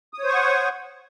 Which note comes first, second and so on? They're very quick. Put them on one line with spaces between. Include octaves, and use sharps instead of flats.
D#6 C#5 C5 C#6 F#5